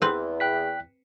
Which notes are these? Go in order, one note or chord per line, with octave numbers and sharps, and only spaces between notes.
E2 C4 B4
G5 F#6 B6